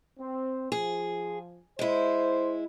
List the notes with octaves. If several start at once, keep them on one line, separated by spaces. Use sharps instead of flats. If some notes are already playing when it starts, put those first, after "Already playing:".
C4
F3 G#4
G#3 E4 C5